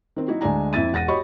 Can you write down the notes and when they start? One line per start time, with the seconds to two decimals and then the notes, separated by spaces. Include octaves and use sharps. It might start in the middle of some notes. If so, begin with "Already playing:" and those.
0.16 D#3 C4
0.28 F#3 D#4 E4 F#4
0.41 D2 G#3 D4 D5 G#5 A#5
0.73 F2 E4 E5 A6 D#7
0.93 E1 F#5 A6 A#6 D#7
1.08 F#4 G4 C#5 D#5 B5 C#6